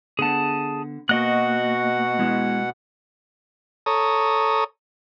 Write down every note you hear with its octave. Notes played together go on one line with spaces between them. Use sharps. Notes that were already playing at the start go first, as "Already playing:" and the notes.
D3 B3 G#4 F#5 A5
B2 A#3 F#4 D#5 F#5 F#6
G#3 B3 E4
A4 C#5 A#5 D#6